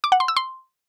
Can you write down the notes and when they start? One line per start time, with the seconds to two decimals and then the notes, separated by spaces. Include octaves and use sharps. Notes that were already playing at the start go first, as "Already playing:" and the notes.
0.04 D6
0.12 F#5
0.20 C6
0.28 E6
0.37 C6